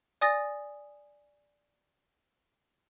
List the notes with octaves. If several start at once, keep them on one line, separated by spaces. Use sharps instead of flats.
D5 G#5 D#6 A6 A#6